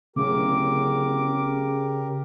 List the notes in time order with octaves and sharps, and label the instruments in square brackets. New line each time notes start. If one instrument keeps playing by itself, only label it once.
[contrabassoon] D1 [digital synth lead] C#3 [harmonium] G4 A#4 [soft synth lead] D6